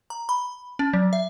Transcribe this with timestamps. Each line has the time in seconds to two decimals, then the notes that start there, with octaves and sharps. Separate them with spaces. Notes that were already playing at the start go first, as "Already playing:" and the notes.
0.10 A#5
0.29 B5
0.79 C#4
0.93 F#3
1.13 E5